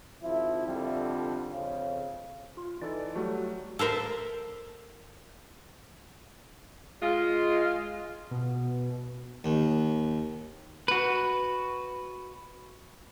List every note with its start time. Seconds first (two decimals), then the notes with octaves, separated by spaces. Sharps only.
0.23 G#1 F3 E4
0.66 F2 D3 F3 G3
1.49 F2 C#3
2.57 F4
2.82 E3 D#4 A4 D5
3.16 F#3 G3 A3 F#4
3.79 A4 A#4 C5 E5
7.02 G#3 F4
8.31 B2
9.44 D#2
10.88 F#4 B4